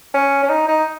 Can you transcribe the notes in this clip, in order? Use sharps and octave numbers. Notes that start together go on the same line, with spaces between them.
C#4
C#4
D#4
D#4